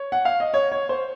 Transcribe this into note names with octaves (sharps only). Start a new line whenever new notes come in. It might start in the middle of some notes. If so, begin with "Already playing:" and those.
Already playing: C#5
F#5
F5
D#5
C#5
C#5
C5